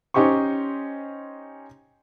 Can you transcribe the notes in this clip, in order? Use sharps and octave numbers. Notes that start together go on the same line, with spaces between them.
C#4 D#4 G4 C5 C#6